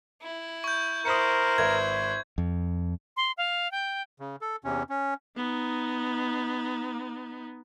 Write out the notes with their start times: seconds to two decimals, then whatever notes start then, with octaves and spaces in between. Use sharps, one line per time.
0.22 E4
0.64 C#6 G6
1.05 E4 A#4 C5 D#6 C#7
1.58 G#1 B4 E5 G#6
2.38 F2
3.17 C6
3.38 F5
3.72 G5
4.20 C#3
4.41 A4
4.64 E2 C3 C#4
4.89 C#4
5.37 B3 D#4